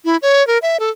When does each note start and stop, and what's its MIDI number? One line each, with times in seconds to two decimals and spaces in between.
0.05 0.17 64
0.22 0.46 73
0.47 0.58 70
0.62 0.78 76
0.80 0.90 69